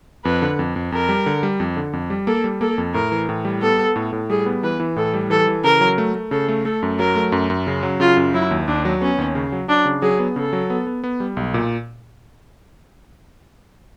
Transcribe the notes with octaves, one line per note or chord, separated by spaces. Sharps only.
F2 B4
D3
F2
F2
F2 A#4
G3
D3
G3
F2
D3
F2
G3
A#3 A4
G3
A#3 A4
F2
A2 A#4
E3
A2
G3
B3 A4
B3
A2
A2
G3 G#4
B3
E3 B4
E3
A2 A4
G3
E3 A4
E3
C#3 A#4
F#3
A3
A3
C#3 A4
A3
A3 A4
F#2
F#3 A#4
A3
F#2
F#2
C#3
F#3
C#3 F4
F#2
F#3 E4
D#2
D#2 D4
F#3
B3 C#4
D#2
C#3
F#3
F#3 D4
C#3
F#3 G#4
B3
C#3 A4
F#3
B3
B3
B3
G3
B1
A#2